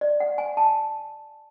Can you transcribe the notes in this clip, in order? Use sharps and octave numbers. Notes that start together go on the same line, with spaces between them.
D5
F#5
G#5
A5